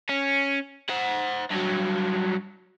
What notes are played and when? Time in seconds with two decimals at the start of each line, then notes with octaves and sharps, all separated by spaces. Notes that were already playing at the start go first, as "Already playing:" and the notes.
0.09 C#4
0.89 C5 F#5
1.50 G2 F#3